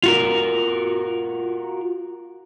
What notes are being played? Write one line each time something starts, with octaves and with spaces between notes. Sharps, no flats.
F4 F#4 A#4